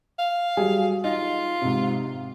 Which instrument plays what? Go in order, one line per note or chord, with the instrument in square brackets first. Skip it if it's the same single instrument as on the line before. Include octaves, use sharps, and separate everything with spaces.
[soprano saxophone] F5
[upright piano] F#3 G3 G#4
[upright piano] D#4 [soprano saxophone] F4
[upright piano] G#2 C3